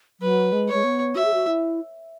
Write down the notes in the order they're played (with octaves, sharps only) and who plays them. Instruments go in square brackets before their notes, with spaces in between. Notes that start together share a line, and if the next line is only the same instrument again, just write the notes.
[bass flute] F#3 [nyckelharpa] B4
[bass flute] G#3
[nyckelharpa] C#5
[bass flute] G#3
B3
[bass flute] F#4 [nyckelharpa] E5
[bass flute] G#4
F#4
E4